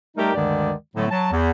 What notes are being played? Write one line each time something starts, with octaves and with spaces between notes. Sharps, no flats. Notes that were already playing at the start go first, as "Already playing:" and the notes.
G3 A3 D#4 G4 A#4
D2 G2 D3 D#3 G#3 D5
A2 D3 F#3 A3 B3
F#3 A5
E2